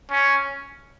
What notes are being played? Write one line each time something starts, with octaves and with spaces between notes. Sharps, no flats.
C#4